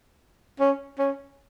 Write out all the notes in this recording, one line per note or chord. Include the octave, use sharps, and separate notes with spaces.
C#4
C#4